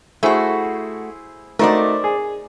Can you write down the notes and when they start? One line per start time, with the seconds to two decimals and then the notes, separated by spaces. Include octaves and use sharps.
0.23 A3 E4 F#4 G#4 C5
1.59 A3 D#4 F#4 A#4 C5 D5
2.04 G#4